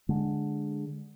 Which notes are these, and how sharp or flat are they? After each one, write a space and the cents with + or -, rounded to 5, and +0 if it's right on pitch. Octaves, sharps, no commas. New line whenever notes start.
D3 +0 G#3 +0